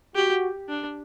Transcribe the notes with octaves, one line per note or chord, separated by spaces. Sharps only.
F#4 G4
D4